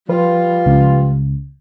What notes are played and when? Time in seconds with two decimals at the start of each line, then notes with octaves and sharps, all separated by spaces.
0.09 F3 G3 F4 B4
0.66 C#2